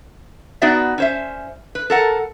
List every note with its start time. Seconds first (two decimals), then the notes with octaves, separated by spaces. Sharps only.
0.62 B3 D#4 F#4 B4 D5 E5
0.98 C#4 C5 E5
1.75 B4
1.90 A4 A#4 F#5